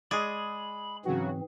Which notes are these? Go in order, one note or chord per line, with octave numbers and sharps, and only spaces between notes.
G#3 G#4 D5 B5
G#2 C#3 E3 F#3 C4 F#4